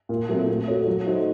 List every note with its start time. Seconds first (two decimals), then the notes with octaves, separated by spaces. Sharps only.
0.09 A#2
0.29 F#3 A3 C4
0.48 C4
0.68 F#4 A4 C#5
0.87 F#3
1.07 A3 D#4 F#4 C5